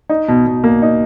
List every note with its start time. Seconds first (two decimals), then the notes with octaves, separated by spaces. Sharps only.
0.09 D#4
0.28 B2
0.46 B2
0.64 A#3
0.82 D#4